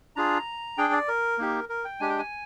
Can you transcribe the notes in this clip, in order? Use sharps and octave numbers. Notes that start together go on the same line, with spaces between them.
D4 F4 G#4 A#5
D4 G#4 G5
D5
A#4
A#3 D#4 G4
A#4
G5
G#3 D4 G4 G#5
G5
G#5